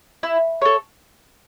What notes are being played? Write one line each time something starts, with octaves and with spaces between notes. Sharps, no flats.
E4
A4 C#5